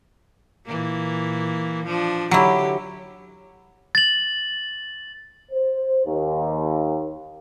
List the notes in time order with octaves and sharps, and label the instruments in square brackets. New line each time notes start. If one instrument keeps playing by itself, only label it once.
[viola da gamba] A#2 E3 A#3
F3 D4
[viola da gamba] D3 G4 [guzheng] F#3 E4
[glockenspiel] A6 F#7
[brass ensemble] C5
D#2